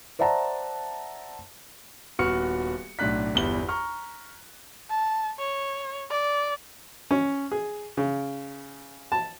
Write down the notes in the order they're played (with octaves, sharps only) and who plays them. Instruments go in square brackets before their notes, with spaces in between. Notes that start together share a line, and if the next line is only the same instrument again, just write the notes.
[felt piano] C5 D5 E5 F#5 A5 A#5
[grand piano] D#1 B3 F#4 C#6 F6 C#7
B1 A2 D4 F#6 B6
G1 E2 E3 G3 G7
A#5 C#6 F6
[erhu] A5
C#5
D5
[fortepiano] C#4
G#4
C#3
A5